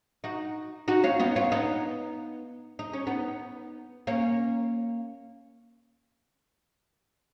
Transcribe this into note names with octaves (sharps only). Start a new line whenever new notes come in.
D#4 F#4
D#4 F#4
C#4 F4
B3 D#4
C#4 F4
B3 D#4
D#4
C#4
B3 D#4
A#3 C#4